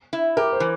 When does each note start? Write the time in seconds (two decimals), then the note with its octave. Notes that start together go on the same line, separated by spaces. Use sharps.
0.13 E4
0.37 G4 A#4
0.52 C5
0.60 E3